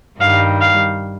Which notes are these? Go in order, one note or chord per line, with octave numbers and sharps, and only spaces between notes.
G2 D#3 G3 F5
F5